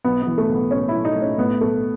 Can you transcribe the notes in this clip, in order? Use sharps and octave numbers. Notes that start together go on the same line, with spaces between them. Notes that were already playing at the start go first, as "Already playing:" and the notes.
B1 B3
E3 B3
A3
B1
B3
A2 C#4
E4
B1
D#4
A2
C#4
A2 B3
B1 A3